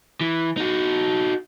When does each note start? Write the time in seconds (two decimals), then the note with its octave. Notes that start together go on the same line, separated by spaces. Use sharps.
0.21 E3
0.57 D#4 F#4